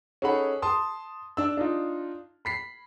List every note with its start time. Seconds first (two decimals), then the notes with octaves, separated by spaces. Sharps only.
0.22 C#4 D#4 G#4 A4 F#5 B5
0.62 A5 C6 D#6
1.37 D4 E6
1.57 D4 D#4 F4
2.45 B5 B6 C7